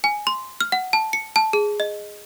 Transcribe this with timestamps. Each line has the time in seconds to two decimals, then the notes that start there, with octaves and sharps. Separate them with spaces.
0.04 G#5
0.27 C6
0.61 F6
0.72 F#5
0.93 A5
1.13 C#7
1.36 A5
1.53 G#4
1.80 D#5